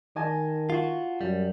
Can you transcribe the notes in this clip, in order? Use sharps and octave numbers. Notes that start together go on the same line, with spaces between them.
D#3 D#5 G#5 A5
F4 F#4
F#2 G3